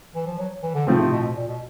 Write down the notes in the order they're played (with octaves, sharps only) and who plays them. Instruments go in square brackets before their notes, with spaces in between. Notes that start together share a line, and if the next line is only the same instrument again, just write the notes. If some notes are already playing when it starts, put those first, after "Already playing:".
[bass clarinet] E3
F3
F#3
E3
D3
[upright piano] A2 F3 A3 C4 [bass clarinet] C#3
[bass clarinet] C3
B2
B2
A#2
B2